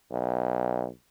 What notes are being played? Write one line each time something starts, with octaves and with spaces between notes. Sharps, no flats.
B1